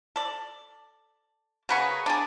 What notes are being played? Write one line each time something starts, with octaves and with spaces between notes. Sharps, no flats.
A4 D5
C#3 F#4 G#4 A#4 B4 C#6
D4 G#4 A#4 B4 D5